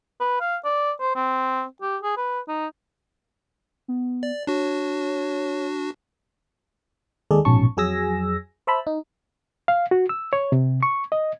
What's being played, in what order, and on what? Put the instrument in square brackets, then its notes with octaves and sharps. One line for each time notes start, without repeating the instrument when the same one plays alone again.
[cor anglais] B4
F5
D5
C5
C4
G4
G#4
B4
D#4
[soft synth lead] B3
[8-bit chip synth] D5
[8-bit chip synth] D4 F#4 [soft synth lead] C#5
[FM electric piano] D#2 G#3 G#4 A4 D5
A#1 G#2 B2 C#4 A5 C#6
F2 F#3 G#4 G#5 E6 A#6
C5 E5 A5 B5
D#4
[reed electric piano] F5
F#4
E6
C#5
C3
C#6
D#5